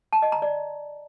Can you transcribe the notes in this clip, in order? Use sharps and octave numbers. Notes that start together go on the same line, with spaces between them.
A5
D#5
A#5
D5